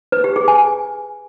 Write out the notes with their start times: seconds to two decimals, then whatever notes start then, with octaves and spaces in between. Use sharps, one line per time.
0.12 B4
0.24 G4
0.36 G#4
0.48 G#5